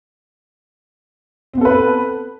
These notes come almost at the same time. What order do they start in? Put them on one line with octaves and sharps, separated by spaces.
C4 B3 A4 B4